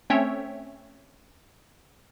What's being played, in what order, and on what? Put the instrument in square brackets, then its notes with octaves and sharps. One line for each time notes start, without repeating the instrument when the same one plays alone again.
[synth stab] A3 C4 C#4 C#5 E5 G5